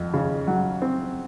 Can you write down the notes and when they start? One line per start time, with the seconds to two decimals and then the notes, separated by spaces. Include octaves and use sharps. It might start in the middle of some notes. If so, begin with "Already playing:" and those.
Already playing: F2
0.14 C#3
0.47 F#3
0.82 C4